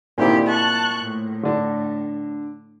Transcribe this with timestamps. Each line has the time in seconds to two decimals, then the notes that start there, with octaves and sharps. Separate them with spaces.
0.18 A#2 D3 D#3 C4 E4 G4
0.47 A5 C#6 F#6
1.03 A2
1.43 D3 D4